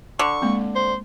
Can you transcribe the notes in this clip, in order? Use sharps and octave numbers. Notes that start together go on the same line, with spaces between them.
D3 C#6
G#3 A#3 C4
C5